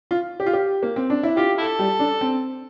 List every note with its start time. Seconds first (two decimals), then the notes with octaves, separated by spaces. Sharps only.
0.11 F4
0.40 G4
0.46 F4
0.53 G4
0.83 A#3
0.96 C4
1.10 D4
1.23 E4
1.37 F4 G4
1.58 E4 A4
1.79 G3
1.99 D4
2.21 C4